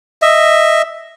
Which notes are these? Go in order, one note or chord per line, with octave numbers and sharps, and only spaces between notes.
D#5 E5